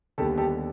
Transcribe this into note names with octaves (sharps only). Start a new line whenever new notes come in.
D#2 D3 G3 B3 G4 A4
G4 A4